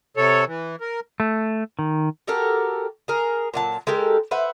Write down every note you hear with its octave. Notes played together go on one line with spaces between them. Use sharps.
C3 A4 C#5
E3
A#4
A3
D#3
F#4 G4 A4 A#4
G#4 A#4
A#2 F#3 A5
G#3 G4 A4 A#4
B4 C5 E5 F#5